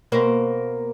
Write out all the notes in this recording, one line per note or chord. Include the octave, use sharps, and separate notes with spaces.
B2 A#3 C5